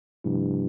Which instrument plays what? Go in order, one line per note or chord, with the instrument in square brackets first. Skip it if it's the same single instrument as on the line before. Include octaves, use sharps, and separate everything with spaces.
[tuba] G2 [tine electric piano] C3 F3 A3 E4